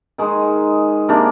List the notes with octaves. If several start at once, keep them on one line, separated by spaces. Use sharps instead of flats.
D#3 G#3 D#4 G#4
C3 D#3 A#3 D4